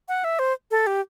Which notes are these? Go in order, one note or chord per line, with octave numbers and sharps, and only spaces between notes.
F#5
E5
C5
A4
G4